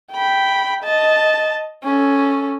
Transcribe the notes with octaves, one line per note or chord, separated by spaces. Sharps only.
G5 B5
D#5 A5
C#4 A4